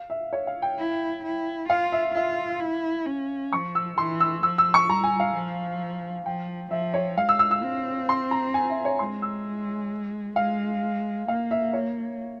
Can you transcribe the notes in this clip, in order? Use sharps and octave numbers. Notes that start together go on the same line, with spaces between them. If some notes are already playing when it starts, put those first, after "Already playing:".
Already playing: F5
E5
C#5
F5
G5
E4
E4
F4 F5
E5
F4 E5
E4
C#4
F3 C#6
E6
E3 C6
E6
F3 E6
E6
C#6
G3 A#5
G#5
F5
F3
F3 G5
F3 E5
C#5
G#3 F5
E6
E6
E6
C4
C6
A#5
G#5
E5
C#5
G#3 C6
E6
G#3 F5
A#3 F5
E5
C#5